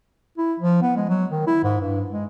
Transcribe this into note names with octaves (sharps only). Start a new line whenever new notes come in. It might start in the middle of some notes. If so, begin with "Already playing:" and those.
E4
F3
B3
G#3
F#3
D#3
E4
G#2
G2
G#3